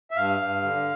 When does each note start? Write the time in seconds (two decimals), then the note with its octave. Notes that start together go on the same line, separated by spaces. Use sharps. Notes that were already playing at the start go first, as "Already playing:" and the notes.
0.11 E5
0.16 G2 F5
0.40 G2
0.63 D3